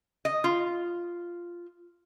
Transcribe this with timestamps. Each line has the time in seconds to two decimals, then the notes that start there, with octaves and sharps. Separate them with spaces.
0.25 D#5
0.44 F4